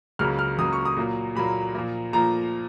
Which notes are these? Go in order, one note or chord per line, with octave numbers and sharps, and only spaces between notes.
C#2 C#3 F#3 A#3 F6
F6
C#2 C#3 F#3 A#3 D#6
C#6
D#6
A#2 F#3 A#3
A#2 F#3 A#3 B5
A#2 F3 A#3
A#2 F3 A#3 A#5